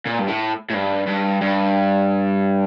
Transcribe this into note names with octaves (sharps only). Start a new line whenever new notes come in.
A#2
G2
A2
A2
G2
G2
G2